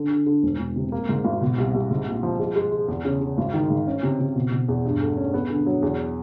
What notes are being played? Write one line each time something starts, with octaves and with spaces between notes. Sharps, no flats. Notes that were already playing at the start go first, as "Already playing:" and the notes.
Already playing: D3
D3
D3
E1
E1
C3
A#3
G#2
G#1
B2
C2
C2
G#2
A#1
F3
G#3
G#3
G#3
E2
C#3
C#3
G#1
D#3
G#2
C#4
C3
C3
B2
B2
E2
G2
A3
C#4
B3
D3
F#3
E2